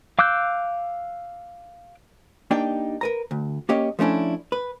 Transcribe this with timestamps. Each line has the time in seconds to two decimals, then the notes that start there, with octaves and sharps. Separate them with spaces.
0.19 F5 D6 E6 F#6 G6
2.51 A#3 D4 D#4 G4 D5 G5
3.01 A#4 B4 A#5
3.31 D2
3.69 A#3 C#4 G4 C#5 D#5
3.99 F3 A3 C#4 D4 E4
4.52 B4